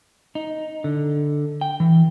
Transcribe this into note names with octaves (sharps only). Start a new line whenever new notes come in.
D#4
D3
G5
E3